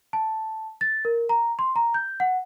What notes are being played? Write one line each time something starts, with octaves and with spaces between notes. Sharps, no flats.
A5
A6
A#4
A#5
C6
A#5
G6
F#5